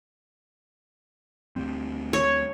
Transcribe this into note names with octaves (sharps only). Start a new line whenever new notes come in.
D2 G3 C4
C#5